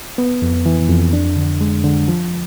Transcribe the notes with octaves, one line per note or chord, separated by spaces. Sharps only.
B3
F2
E3
F2
D4
D3
G#3
D3
F3